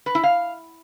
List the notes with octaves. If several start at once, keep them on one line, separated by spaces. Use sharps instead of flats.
B4
E4
F5